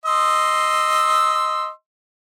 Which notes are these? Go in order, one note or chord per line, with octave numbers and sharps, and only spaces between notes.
D#5 C6 E6